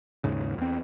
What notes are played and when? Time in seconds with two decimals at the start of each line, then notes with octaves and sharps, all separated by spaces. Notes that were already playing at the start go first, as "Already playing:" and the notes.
0.24 D#2 G#2 C#3
0.58 E2 C4